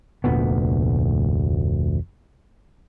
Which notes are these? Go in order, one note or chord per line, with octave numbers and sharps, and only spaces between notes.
F1 D2 A#2 B3